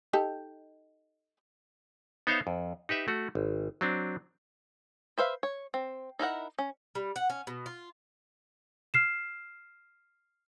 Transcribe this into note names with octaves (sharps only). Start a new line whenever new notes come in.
D#4 G4 A4
B3 D#4 C5 C#5 E5 F5
F2
D#4 G4 B4 E5
A3 F#4
G#1
F#3 C4 D4
B4 C5 E5 F5
C#5
C4
D#4 E4 A#4 F#5
C#4
G3
F#5
C#4
B2
F4
F6 C7 E7